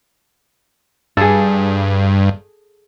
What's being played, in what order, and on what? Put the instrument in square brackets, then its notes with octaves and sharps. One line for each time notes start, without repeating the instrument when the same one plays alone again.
[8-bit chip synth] G2 [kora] G#4 A4